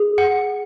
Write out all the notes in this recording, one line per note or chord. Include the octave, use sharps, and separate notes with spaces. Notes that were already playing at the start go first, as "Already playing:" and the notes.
Already playing: G#4
F#5